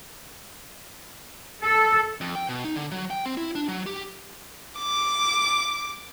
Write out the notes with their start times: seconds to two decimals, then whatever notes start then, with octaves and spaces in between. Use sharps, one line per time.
1.63 A4
2.21 F2
2.35 G5
2.49 B2
2.65 D#4
2.76 D3
2.91 F#3
3.10 G5
3.26 C4
3.37 E4
3.55 D4
3.68 F#3
3.86 G4
4.78 D6